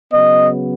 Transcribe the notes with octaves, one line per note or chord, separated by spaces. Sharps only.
C#3 F#3 B3 D#5